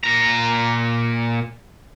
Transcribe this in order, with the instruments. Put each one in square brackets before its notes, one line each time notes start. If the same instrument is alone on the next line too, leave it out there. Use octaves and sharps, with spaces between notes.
[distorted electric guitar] A#2 A#5